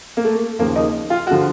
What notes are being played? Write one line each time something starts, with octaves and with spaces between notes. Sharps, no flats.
A#3
A3
D#2 C#3 F3 A#3
D#4
F4
F#4
D3 F3